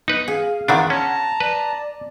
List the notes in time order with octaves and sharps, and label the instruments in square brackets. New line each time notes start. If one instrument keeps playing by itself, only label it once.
[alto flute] B3 [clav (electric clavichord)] D#4 B4
[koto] G#4 [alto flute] F5
[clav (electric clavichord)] D#3 E3 D4 [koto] B3 F4 E5 [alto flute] F#5
[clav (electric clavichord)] C#4 [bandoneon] A5 A#5
[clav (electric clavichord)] B4 [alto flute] D5